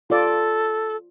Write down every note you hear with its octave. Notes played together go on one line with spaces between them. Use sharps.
F4 A4 D5